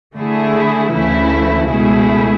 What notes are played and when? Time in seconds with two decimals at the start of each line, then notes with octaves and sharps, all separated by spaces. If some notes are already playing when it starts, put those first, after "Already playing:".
0.16 D3 A3 E4 G#4
0.93 D2 C#3 E3 A3 E4
1.71 C#2 B2 A3 E4 G#4